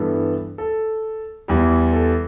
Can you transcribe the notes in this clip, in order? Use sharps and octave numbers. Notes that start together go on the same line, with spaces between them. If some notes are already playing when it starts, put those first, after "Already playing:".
Already playing: G2 E3 B3 A4
A4
E2 E3 G3
A4